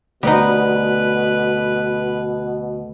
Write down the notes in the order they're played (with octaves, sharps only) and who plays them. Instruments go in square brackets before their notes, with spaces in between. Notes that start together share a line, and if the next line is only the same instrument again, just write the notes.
[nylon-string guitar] D2 [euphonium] B2 [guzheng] G3 B3 D#4 [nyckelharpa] B4